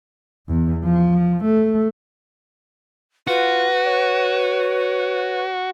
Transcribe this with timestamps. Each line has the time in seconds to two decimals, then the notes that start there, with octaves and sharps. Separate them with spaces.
0.48 E2
0.84 F3
1.44 A3
3.27 F4 F#4 B4
3.86 C#5